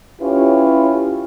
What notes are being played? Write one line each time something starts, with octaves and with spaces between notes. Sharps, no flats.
C#4 E4 F4 G4 B4 C#5